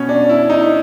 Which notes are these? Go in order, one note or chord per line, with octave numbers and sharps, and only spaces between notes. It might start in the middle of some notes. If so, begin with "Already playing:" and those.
Already playing: B2 C#4
D4
E4
D#4